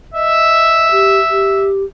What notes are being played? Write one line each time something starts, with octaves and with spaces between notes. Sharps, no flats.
D#5 E5
G4
G4